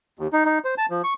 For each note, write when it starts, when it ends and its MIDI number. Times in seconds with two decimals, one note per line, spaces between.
0.19 0.28 39
0.33 0.44 63
0.45 0.59 63
0.64 0.75 72
0.78 0.86 81
0.90 1.02 53
1.04 1.14 85